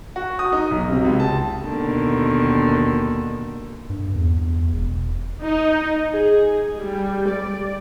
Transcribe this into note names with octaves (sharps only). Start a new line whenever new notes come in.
F#4
D#6
D#4
B1
C3
C#2
A5
D#2 B2 D3 D#3
G2
E2
E1
D#4
G#4
G3
D5